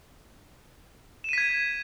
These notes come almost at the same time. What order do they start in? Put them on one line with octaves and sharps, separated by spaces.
E7 D#7 B6 G#6